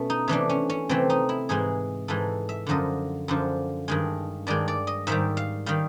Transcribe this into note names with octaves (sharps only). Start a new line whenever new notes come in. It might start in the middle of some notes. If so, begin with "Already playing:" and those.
Already playing: B2 A3 C#4
D#4
C3 E3 A3 D4
C#4
C#4
C3 E3 A3 C4
D#4
E4
G#2 E3 G#3 G#4
G#2 E3 G#3 A4
E5
F#2 D3 F3 D#5
F#2 D3 F3
G2 D#3 G#3
G2 D#3 G#3 D5
D5
D#5
G#2 D#3 G3 E5
F5
D#3 G3 F5